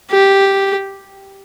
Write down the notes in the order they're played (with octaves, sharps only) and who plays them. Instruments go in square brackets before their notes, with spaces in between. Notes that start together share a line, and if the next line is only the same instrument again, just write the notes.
[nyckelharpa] G4